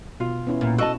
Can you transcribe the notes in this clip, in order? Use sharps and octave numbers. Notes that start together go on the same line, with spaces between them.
B2 F4
B3 C#4 E4
A#2
F#4 A4 D#5 A5